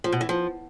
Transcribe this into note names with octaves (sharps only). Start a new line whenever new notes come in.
F3
B2
E3
F3